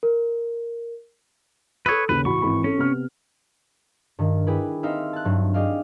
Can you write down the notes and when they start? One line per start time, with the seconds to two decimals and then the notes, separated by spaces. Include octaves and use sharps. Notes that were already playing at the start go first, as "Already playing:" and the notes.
0.03 A#4
1.86 A4 B4 C#5 D#6 E6
2.09 D#2 C#3 C#4 B4
2.25 A1 F#4 B5 C#6
2.42 G#1 E3 B5
2.64 C#4 A4
2.76 C3 B3 F6
4.19 G2 D#3
4.47 E4 G4 G#4 B4
4.83 C4 D#4 C5 E5 F5
5.13 A5 F#6
5.25 G2 F#3
5.54 G4 G#4 D5 D#5 F5